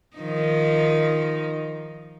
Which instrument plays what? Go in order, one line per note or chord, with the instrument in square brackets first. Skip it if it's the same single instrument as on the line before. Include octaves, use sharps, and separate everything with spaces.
[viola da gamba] D#3 F3 D#4